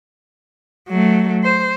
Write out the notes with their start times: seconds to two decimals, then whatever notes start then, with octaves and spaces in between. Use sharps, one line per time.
0.89 F#3 A3
1.44 C5